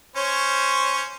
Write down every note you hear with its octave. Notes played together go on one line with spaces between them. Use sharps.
C#4 C5 C#5